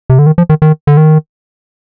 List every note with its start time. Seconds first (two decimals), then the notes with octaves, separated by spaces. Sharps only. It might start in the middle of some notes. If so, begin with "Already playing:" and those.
0.10 C3
0.19 D3
0.27 D#3
0.38 F3
0.49 D#3
0.62 D#3
0.87 D3
0.97 D#3